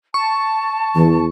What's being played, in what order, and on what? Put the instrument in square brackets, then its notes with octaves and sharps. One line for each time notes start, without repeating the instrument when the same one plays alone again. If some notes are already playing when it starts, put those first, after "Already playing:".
[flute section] A5 [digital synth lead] C#6
[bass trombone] E2 [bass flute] E3